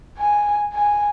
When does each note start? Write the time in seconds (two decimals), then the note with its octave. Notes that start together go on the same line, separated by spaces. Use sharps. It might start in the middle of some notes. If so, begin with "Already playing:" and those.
0.18 G#5
0.74 G#5